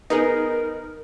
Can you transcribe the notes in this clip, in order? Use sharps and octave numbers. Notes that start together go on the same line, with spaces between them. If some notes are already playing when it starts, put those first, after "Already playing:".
B3 D#4 G#4 A#4